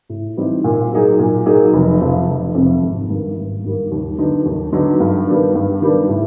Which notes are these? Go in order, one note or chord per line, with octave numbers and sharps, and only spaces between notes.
A2
E3 G3 C4 D#4
A#2
F#3 A#3 D#4 G#4
A#2
F#3 A#3 D#4 G#4
F1
F2 C3 F3
F1
F2 C3 F3
G#1
G2 D#3 G3 A#3
G#1
G2 D#3 G3 A#3
D#2
D3 F#3 B3 D#4
D#2
D3 F#3 B3 D#4
G2
D#3 G3 B3 D4
G2
D#3 G3 B3 D4
A2